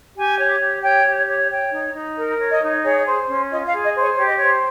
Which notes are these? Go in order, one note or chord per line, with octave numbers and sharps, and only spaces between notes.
G4 G#5
C#5
G4
C#5 G5
G4
C#5
C#5 G5
D#4
D#4
A#4
C#5
D#5
D#4
G#4 C#5
C5
C#4
F4 D#5
F5
G#4
D#5
C5
C#5
G4 C#5
D#5
C5 C#5